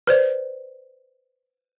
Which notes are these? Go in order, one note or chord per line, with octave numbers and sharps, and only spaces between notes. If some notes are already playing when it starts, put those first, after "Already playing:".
B4 C5 D5